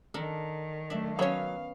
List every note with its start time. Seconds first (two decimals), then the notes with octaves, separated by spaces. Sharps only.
0.14 D#3 D4 A4 A#4
0.90 F#3 A3 D4 E5
1.19 F#3 B3 C#4 C#5 F5